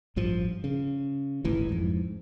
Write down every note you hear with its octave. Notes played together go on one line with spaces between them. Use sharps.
A1 G2 F3
C#3
D1 G1 A2 E3
F2 G#2